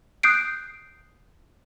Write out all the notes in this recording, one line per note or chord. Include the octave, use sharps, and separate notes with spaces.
D#6 F#6 G6 C7 D7